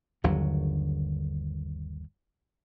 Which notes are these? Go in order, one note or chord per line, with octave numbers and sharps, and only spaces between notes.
G1 D#2 D3 F#3